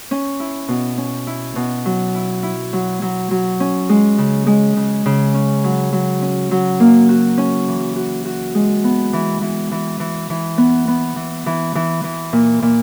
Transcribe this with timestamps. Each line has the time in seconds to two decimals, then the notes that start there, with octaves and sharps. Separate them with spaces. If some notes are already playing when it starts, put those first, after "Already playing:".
0.11 C#4
0.40 E4
0.68 B2
0.98 C#4
1.27 E4
1.56 B2
1.86 F#3
2.15 E4
2.43 E4
2.73 F#3
3.02 F#3
3.31 F#3
3.60 C#4
3.89 G#3
4.18 C#3
4.47 G#3
4.77 C#3
5.06 C#3
5.34 C#4
5.64 F#3
5.93 F#3
6.22 C#4
6.51 F#3
6.80 A#3
7.09 F#4
7.38 C#4
7.68 E3
7.96 F#4
8.25 F#4
8.55 G#3
8.84 B3
9.13 E3
9.41 E3
9.72 E3
10.00 E3
10.30 E3
10.58 B3
10.88 B3
11.16 E3
11.46 E3
11.75 E3
12.04 E3
12.33 A#2
12.62 A#2